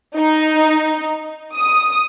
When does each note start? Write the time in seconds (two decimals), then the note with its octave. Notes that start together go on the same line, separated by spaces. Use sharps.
0.18 D#4
1.58 D#6